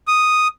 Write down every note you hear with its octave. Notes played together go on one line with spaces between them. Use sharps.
D#6